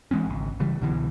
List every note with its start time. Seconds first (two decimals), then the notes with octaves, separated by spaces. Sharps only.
0.11 E3 G#3 C4 C#4
0.26 G#1 C#2
0.60 C#3 E3 G3
0.82 C2 B2 D3 E3